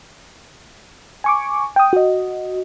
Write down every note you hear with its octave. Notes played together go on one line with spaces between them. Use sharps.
G#5 C#6 D6
G5 D#6
F#4 D#5